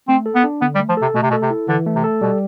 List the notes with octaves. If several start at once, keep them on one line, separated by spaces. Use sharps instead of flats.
A3 C4
A4
B3
D4
D3 B3
G3
A3
F3
C3 A4
B2 A3
C3
B2
A4
C3
E4
D3 E3
A3
C3
A4
B2 G3